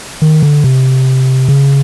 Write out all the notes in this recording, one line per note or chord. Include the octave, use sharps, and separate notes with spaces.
D#3
D3
C3
C#3